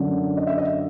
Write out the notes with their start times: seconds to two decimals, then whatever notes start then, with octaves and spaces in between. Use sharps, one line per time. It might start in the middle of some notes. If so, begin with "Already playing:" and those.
Already playing: F#2 D3
0.37 D#5
0.47 E5
0.58 D#5